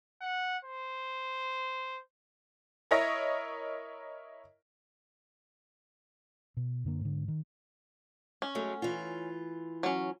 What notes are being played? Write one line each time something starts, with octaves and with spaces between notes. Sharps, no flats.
F#5
C5
E4 A#4 C#5 D#5 A#6
B2
F#2 D3 A#3
G#2 D3
D#3
C#4
F#3 G#3 A3
E3 F4
F#3 C#4